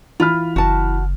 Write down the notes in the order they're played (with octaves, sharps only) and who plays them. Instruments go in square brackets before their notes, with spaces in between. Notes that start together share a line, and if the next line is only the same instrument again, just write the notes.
[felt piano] E3 B5 F6 [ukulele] F4
[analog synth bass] F#1 [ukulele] F#4 A5